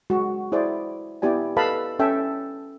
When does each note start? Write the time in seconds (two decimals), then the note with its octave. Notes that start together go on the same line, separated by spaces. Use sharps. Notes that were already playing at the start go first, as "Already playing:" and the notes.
0.10 G#3 F#4
0.52 E4 G#4 C5 D5
1.22 B3 E4 G4 D5 G#5
1.57 A4 B4 D#5 F5 A5 B5
1.99 C#4 A4 E5 G5 G#5